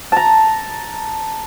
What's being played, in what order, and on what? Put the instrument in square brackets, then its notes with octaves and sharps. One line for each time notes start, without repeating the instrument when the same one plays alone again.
[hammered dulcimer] A5 A#5